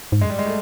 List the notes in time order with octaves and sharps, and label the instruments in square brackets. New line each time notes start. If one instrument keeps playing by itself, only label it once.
[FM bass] G#2
[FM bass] G2 [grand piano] G#3
[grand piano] G3
G#3
A3